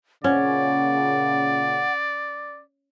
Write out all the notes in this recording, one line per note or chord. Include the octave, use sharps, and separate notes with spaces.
A#2 C#3 C#4 D5 F#5